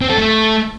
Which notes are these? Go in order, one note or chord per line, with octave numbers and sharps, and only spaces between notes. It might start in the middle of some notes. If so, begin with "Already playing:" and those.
C4
A4
A3